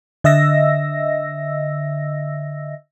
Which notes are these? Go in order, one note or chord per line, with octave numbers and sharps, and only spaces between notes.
D3 D#5 E5 E6 A#6